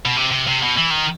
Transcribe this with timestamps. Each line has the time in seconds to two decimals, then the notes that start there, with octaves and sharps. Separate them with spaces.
0.06 B2
0.17 C3
0.32 C3
0.48 C3
0.63 B2
0.78 E3
0.91 D#3